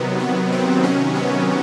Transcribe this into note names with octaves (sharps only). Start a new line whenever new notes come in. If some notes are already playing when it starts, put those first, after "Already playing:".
Already playing: C3 D#3 F#3 B3
B3
C4
C3 D#3 F#3 C#4
B3